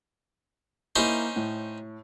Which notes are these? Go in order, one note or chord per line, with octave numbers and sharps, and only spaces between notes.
A#3 C#4 D#4 E4 C5
A2